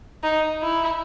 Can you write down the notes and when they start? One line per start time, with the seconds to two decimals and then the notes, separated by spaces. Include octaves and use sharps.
0.23 D#4
0.63 E4